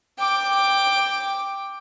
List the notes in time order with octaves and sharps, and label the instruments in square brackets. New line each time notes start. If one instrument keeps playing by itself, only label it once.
[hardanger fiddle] G5 D6